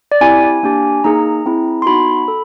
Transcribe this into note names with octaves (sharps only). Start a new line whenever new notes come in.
D5
C4 E4 G4 G#5
A#3 D4 G4
A#3 D#4 G#4 A#5
C4 E4 G#4
C6
B3 D#4 F#4 B5
A4